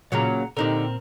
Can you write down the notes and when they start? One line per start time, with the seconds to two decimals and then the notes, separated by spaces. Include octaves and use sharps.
0.12 A#2 C#3 F#3 F#5 A#5
0.57 A#2 D3 C4 D#4 G4 A#4